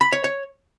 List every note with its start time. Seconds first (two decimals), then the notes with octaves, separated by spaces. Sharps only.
0.01 B5
0.12 C#5
0.24 C#5